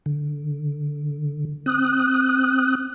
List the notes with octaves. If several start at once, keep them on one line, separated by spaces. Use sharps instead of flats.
D3
C4 D#6 F#6